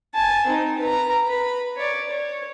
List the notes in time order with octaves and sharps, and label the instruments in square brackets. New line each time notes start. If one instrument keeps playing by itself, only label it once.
[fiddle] G#5 A5
C4 D#4
B4 A#5
B4 B5
C#5 D5
C#5